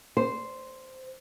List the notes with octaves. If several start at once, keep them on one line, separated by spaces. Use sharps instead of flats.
C5